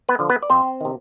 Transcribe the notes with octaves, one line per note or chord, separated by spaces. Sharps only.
B3 B4
D3 F3
B3 B4
D5
F2 C4 C5
C3 D#3